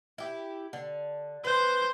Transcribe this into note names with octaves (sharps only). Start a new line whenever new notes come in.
E4 G4
D3
B4 C5